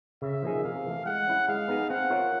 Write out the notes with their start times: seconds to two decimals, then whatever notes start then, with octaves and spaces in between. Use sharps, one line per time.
0.22 C#3 E5
0.43 F3 A#3 D#4 G#4
0.64 C3 F5
0.85 E3 A3
1.06 G#3 F#5
1.27 C#4 E4
1.48 G#3 F5
1.68 B3 D#4 G#4 B4
1.90 C4 F#5
2.10 F4 A#4 C#5 E5